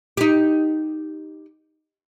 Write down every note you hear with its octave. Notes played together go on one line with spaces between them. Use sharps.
D#4 G4